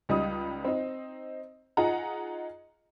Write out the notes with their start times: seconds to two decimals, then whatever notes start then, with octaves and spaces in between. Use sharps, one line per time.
0.09 C#2 G3 D#4 D#6
0.65 C4 D#4
1.77 D#4 F4 G#4 F#5 A#5